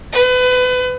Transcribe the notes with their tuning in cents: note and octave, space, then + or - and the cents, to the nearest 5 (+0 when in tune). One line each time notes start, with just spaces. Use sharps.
B4 +30